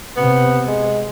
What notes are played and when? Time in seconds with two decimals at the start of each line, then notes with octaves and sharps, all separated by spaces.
0.17 C3 B3
0.67 G#3